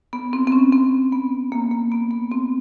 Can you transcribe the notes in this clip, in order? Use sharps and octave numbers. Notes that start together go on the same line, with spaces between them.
B3
C4
C4
C#4
C4
B3
A#3
A#3
B3
B3
C4